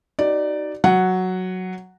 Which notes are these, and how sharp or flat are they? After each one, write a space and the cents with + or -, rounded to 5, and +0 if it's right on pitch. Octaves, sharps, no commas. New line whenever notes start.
D#4 +0 F#4 +45 D5 +0
F#3 +0 F#5 +0